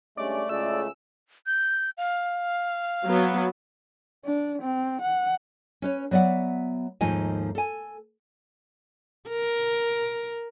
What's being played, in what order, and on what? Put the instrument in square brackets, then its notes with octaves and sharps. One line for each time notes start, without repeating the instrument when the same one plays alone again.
[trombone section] G2 G#3 C#4 [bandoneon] A3 [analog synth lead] D5
[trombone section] C#2 A2 G#4 [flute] D5 [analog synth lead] E6
[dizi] G6
F5
[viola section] F#3 B3
[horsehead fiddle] D4
C4
F#5
[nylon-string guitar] C#4 B4 C#5
F#3 B3 D5 E5 F#5
D#2 G#2 F3 A3 D#4 G#5
A4 G#5
[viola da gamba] A#4